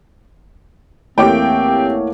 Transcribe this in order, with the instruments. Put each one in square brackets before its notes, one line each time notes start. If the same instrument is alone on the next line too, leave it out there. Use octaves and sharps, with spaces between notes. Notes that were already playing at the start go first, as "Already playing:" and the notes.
[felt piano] E2 C#5 D6 [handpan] A3 A#3 [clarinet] C4 [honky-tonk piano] G4 G5